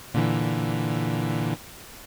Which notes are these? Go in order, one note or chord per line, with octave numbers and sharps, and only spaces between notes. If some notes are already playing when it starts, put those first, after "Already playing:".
A#2 D3 E3